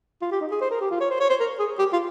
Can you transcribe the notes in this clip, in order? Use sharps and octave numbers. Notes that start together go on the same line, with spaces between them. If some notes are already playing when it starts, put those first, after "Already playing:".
F4
G4
D#4
G#4
C5
A#4
G4
F4
C#5
C5
C#5
C5
A#4
G#4
G4
F4